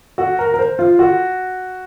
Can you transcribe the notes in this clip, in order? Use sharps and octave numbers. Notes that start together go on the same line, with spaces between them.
F#4
A#4
A#4
C5
F4
F#4